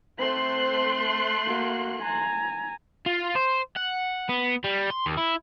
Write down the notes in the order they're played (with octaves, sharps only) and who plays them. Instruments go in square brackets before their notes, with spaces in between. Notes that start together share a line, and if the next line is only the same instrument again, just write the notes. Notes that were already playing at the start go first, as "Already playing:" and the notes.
[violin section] A3 C6 F#6 [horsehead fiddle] C4 C5
[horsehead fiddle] A#3 F#4
G#5 A#5
[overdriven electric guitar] F4
C5
F#5
B3
G3
C6
D#2
E4